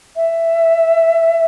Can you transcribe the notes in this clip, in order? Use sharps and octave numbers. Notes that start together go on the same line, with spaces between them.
E5